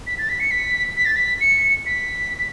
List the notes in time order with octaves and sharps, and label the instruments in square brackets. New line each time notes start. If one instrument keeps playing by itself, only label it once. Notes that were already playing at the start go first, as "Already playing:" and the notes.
[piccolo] B6
A6
B6
C#7
B6
B6
A6
B6
C#7
B6